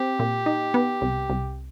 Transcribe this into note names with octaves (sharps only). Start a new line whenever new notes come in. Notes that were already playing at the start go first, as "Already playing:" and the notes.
Already playing: C4 G4
A#2
D#4
B3
C2
C2